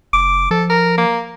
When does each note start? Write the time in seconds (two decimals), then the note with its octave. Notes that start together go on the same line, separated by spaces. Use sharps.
0.13 F#1 D6
0.51 F3 A4
0.70 A#4
0.98 A#3